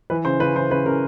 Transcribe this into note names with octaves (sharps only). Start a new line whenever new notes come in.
E3 B4
C#3 C5
C#3 B4
E3 C5
C#3 B4
C#3 A#4